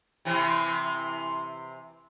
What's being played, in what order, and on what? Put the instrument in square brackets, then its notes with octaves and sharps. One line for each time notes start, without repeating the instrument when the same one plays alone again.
[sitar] C3 E3 C4